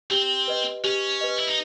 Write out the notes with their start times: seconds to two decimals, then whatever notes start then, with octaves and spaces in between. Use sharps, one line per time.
0.11 C4 G4
0.48 B4 D#5
0.84 C#4 G4
1.21 B4 D#5
1.39 E4
1.47 D#4